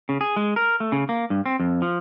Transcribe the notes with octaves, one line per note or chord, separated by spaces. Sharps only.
C#3
G#4
G#3
A#4
A3
C#3
A#3
G2
C4
F2
F3